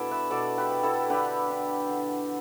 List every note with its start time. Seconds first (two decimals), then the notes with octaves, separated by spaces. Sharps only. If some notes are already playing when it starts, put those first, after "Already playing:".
Already playing: B2 D4 E4 A4 D5
0.11 B4 E5
0.30 B2 A4 D5
0.58 G4 B4
0.71 B3
0.83 E4 A4
1.10 D3 G4 B4
1.50 D4
1.89 D3